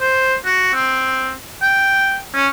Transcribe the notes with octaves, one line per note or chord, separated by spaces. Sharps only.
C5
F#4
C4
G5
C#4